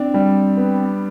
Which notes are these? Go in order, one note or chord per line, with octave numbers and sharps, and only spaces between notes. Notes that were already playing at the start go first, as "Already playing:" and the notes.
Already playing: C4 D4
G3
B3